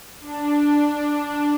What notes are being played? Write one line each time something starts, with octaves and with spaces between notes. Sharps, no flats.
D4